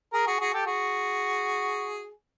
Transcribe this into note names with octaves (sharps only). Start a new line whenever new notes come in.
G#4 A#4
F#4 G#4
F#4 G#4
G4 A4
F#4 G#4